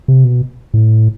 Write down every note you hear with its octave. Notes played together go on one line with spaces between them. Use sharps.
C3
B2
A2